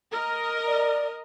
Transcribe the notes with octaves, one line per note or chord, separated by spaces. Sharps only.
A#4 D#5
D5